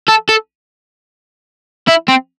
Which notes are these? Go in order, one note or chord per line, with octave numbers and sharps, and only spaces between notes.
A4
A4
E4
C4